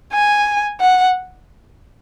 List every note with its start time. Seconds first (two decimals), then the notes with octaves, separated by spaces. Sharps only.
0.13 G#5
0.81 F#5